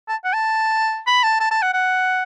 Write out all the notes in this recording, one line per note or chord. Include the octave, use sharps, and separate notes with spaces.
A5
F#5
A5
B5
A5
A5
A5
F#5
F#5